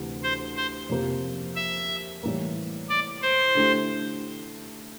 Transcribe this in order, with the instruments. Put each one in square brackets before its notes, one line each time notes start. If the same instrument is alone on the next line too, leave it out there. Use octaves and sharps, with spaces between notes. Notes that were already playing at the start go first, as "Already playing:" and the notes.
Already playing: [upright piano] D2 C3 E3 A3
[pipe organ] C5
C5
[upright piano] F2 C3 F3 A#3
[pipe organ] E5
[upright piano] A2 E3 G3 A#3
[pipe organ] D5
C5
[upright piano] D3 A3 E4 G4